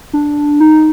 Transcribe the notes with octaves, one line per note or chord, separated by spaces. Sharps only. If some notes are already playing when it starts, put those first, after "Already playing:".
D4
D#4